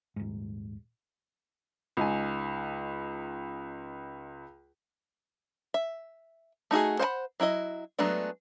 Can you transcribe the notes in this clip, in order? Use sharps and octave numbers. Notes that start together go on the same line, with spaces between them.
D#1 G#2
C#2 D#4 G#5
E5
A3 D#4 F#4 G#4
C5 F#5 G#5 B5
F#3 E4 F4 D#5
F#3 G#3 A3 B3 D4